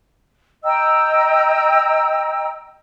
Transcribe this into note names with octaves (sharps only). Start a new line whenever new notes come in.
D#5 G5 A#5 E6